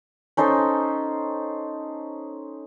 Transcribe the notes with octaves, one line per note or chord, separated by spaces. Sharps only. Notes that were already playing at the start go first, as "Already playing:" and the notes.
C#4 D#4 A4 C5